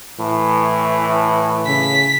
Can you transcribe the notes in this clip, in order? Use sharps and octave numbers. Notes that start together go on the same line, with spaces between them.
A2 E3
C#3 B6